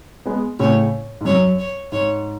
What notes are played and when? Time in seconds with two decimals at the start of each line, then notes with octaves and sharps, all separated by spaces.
0.26 G#3 B3
0.59 A2 C#3 C#5
1.21 G#2
1.25 F#2 C#5
1.59 C#5
1.92 G#2 C#5